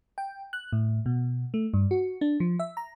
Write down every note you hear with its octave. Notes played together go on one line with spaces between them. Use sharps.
G5
F#6
A2
B2
A3
G2
F#4
D4
F3
E5
A#5